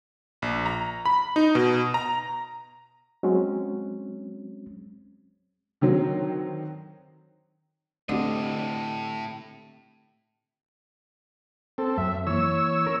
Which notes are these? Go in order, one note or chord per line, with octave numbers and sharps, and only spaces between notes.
A#1
A#5
B5
D#4
B2
A#5
F#3 G#3 C4 C#4
D3 D#3 F#3 C4
A2 D3 A3 C4 G4 D#5
C4 A4
F#2 E5
E3 A#3 C#5 E6
C#4 A#4